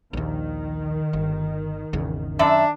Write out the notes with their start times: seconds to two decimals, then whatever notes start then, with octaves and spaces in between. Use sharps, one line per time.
0.13 A#1 D#2 D#3
1.13 G1
1.93 G#1 E2 C#3
2.39 F#2 D4 D5 E5